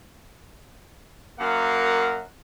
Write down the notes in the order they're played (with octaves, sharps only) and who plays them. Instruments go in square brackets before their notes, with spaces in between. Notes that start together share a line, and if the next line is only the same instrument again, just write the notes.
[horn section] F#2 A#3 A#4 F5 F#5